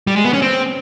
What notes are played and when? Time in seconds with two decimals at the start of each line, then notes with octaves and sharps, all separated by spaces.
0.07 G3
0.16 G#3
0.25 B3
0.33 C#4
0.42 C4